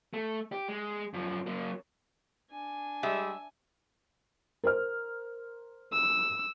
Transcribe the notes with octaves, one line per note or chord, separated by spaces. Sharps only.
A3
G4
G#3
F#2 F3
F#3 A#3
D4 G#5
G3 G#3 E5
A#4 C5 F6
E6